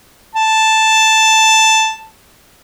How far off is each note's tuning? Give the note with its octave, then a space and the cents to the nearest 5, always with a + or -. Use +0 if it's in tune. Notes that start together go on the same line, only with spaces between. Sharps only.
A5 +0